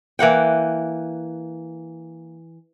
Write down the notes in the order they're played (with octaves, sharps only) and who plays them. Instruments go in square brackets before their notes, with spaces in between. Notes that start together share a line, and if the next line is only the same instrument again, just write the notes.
[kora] E3 A#3 F#5 G5